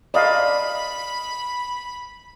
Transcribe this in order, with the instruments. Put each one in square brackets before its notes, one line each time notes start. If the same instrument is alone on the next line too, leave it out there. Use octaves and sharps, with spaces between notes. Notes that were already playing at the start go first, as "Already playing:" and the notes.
[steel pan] D5 D#5 F5 [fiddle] B5